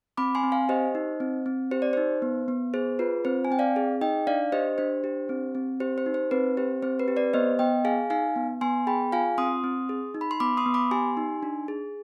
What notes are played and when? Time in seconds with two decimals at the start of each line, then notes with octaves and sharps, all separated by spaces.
0.17 C4 B5 D6
0.35 G#5 C6
0.43 C4
0.52 F5 G#5
0.69 G4 C5 D#5
0.95 D#4
1.20 C4
1.46 C4
1.71 G4 C5
1.82 D5
1.93 D#4 C5
2.22 B3
2.48 B3
2.74 G#4 C5
2.99 F4 B4
3.25 C4 C5
3.45 G#5
3.50 C4 G5
3.59 D5 F5
3.76 G#4
4.01 D#4 D#5 G5
4.27 D4 D5 F5
4.52 G4 C5 D#5
4.78 D4 C5
5.04 G4
5.29 C4
5.55 C4
5.80 G4 C5
5.98 C5
6.06 D#4
6.14 C5
6.31 C4 B4
6.57 G4 C5
6.83 C4 C5
6.99 B4
7.08 G4
7.17 B4 D5
7.33 B3 C5 D#5
7.59 B3 D#5 G5
7.85 G#4 F5 G#5
8.10 D#4 F5 G#5
8.36 B3
8.61 B3 G#5 C6
8.87 G#4 G5 B5
9.12 F4 F5 G#5
9.38 C4 C6 D#6
9.64 C4
9.89 G#4
10.14 D#4
10.21 B5
10.31 C6
10.40 B3 B5 D6
10.57 C6 D#6
10.66 B3
10.74 B5 D6
10.91 G4 G#5 C6
11.17 D#4
11.43 D4
11.68 G#4